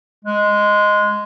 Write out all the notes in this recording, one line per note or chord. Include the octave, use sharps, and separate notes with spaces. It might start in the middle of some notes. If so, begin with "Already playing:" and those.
G#3